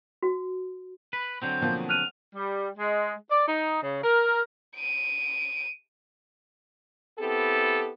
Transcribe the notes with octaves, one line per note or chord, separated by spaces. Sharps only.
F#4
B4 B5
D3 F#3 C4 G6
B2 F3 A#3
F6 F#6 D#7 F7
G3
G#3
D5
D#4
C#3
A#4
D7 D#7
B3 C4 E4 G4 A4